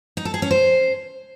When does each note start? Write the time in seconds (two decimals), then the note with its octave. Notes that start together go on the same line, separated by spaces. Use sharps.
0.17 D#4
0.25 A4
0.34 G#4
0.42 C#4
0.51 C5